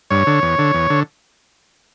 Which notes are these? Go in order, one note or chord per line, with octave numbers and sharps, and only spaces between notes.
G2 C#5
D3
E2
D3
E2
D3